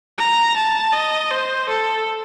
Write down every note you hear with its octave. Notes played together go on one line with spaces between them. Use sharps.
A#5
A5
D#5
C5
A4